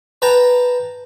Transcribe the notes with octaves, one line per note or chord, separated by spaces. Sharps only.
B4 G5 A5 A#5